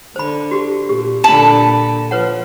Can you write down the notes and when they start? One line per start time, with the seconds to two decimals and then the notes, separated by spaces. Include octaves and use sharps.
0.16 D3 C5 B5
0.51 F#4 G4
0.89 A#2 G4
1.24 A#2 D3 A5 B5
2.11 F3 B4 C#5 F#5